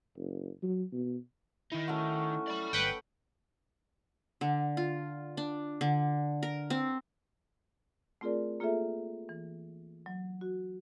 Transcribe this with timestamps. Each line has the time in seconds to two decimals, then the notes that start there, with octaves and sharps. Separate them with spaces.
0.17 F#1
0.63 F#3
0.92 B2
1.72 D#3 D#4 E4
1.88 A3 C#4 F#4
2.48 D5 B5
2.73 G1 B4 F#5 G5
4.41 D3
4.77 F4
5.37 D4
5.81 D3
6.43 A#4
6.70 C4
8.21 A3 C4 F4 G#4 A#4 D5
8.60 A#3 F4 G#4 A4 E5
9.29 E3
10.06 F#3
10.41 F#4